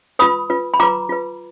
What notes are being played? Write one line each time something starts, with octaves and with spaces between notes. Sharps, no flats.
F4 B4 B5 D#6
F4 B4
B5
F4 B4 A#5 D6
F4 B4